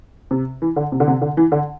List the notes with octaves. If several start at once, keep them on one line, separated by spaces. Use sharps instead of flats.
C3
E3
D3
C3
D3
C3
D3
E3
D3